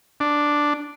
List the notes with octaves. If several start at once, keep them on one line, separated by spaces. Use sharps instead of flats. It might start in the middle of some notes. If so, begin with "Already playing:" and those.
D4